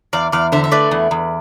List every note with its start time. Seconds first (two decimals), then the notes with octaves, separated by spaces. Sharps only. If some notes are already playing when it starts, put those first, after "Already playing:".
0.13 E2 D5 F5
0.32 E2 D5 F5
0.52 D3 C5 E5
0.64 E5
0.72 A3 B4 D5
0.91 E2
1.11 E2